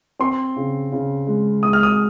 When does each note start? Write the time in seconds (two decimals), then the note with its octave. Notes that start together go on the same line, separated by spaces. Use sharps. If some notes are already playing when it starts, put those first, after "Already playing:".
0.19 C4 C6
0.56 C#3
0.92 C#3
1.27 G#3
1.63 G#3 D#6
1.73 F6
1.83 D#6